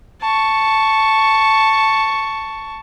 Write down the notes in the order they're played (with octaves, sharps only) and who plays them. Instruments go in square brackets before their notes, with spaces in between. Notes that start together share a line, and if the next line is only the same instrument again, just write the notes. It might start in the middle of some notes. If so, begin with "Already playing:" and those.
[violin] A5 C#6